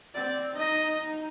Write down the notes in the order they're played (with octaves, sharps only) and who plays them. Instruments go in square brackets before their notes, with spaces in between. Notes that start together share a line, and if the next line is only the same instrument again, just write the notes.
[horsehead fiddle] C4 [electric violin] D5
[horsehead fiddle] D#4 [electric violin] D#5
[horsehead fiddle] D#4